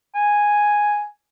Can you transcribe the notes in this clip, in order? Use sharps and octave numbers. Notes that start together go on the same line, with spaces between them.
G#5